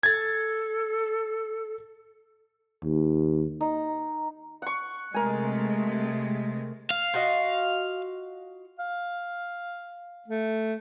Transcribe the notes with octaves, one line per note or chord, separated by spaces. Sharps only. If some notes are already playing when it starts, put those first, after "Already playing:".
A4 G#6 A6
D#2
D#4
F#5 C#6
C3 G#3 A3 A#4 G#5
F5
F4 F#4 D#5
F5
A3